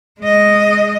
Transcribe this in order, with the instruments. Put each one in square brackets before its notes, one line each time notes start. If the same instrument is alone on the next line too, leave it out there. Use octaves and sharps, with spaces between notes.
[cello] G#3 D#5